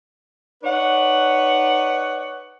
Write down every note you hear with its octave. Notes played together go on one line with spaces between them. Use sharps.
D#4 B4 C#5 D5 F#5